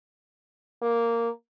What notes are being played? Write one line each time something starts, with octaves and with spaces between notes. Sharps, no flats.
A#3